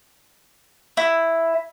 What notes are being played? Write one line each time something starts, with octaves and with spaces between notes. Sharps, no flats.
E4